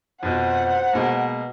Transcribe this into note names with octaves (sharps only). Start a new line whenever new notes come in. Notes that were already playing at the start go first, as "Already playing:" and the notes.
F2 B2 C5 F#5
B2 G#3 A#3